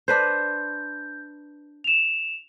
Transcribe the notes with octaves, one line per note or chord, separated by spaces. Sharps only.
D4 B4 C5 G6
E7 F7